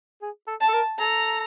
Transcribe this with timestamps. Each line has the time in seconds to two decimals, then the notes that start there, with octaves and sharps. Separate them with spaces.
0.22 G#4
0.47 A4
0.60 A5
0.68 A4
0.73 A#4
0.98 A4 A#5